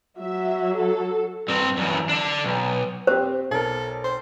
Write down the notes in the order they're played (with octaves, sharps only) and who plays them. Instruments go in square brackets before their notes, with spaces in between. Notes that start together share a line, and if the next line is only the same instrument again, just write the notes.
[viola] F#3 [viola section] E5
[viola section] A4
[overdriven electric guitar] G2 C4
F#2 E3
D3 D4
B1
[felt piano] C4 G4 [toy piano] C5
[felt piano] B1 A#4 [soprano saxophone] A4
[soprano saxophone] C5